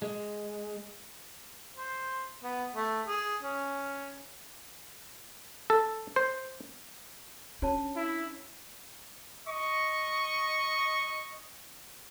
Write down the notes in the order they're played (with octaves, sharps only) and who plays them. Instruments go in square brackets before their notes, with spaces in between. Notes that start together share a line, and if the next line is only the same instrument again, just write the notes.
[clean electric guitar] G#3
[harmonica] C5
B3
A3
G#4
C#4
[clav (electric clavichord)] A4
C5
[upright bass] C#4 D4 [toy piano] F#4 C#5 A5
[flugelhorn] E4
[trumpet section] D#5 C#6